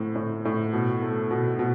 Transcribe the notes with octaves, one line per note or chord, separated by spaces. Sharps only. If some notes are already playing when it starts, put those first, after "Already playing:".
Already playing: A2 C4
A2
A2
B2
A3
B2
B2